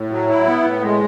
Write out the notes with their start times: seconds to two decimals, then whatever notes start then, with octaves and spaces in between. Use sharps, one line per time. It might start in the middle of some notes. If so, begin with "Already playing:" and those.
Already playing: A2
0.11 F#3
0.29 E4
0.47 B3
0.64 A2
0.82 G#3